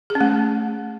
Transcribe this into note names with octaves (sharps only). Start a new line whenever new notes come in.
G#4
C#4
A3